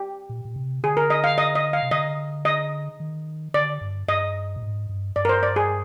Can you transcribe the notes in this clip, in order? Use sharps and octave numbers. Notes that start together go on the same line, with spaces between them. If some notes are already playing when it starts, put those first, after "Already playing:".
Already playing: G4
A#2
A#2
C3
D3 G#4
A#4
D#5
F5
D#5
D#5
F5
C3
D3 D#5
D#5
D#3
D3 D5
G2
G2 D#5
A#2
G#2
G2
G2 D5
A#4
C5
D5
G#4